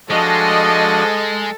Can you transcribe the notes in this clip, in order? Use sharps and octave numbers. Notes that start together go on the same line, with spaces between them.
F3 G#3 D4 F#4 A4 D#5